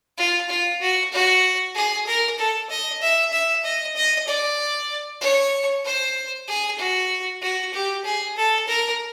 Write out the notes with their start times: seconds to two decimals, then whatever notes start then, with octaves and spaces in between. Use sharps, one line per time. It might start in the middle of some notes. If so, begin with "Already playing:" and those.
0.18 F4
0.49 F4
0.81 F#4
1.13 F#4
1.75 G#4
2.06 A#4
2.38 A4
2.70 D#5
3.01 E5
3.33 E5
3.64 D#5
3.96 D#5
4.27 D5
5.21 C#5
5.85 C5
6.48 G#4
6.78 F#4
7.42 F#4
7.73 G4
8.05 G#4
8.36 A4
8.68 A#4